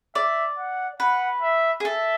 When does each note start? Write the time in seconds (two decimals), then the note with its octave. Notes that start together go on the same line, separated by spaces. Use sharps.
0.15 D5 E5
0.58 F#5
1.00 B4 F#5
1.42 E5
1.80 G#4
1.85 A4 E5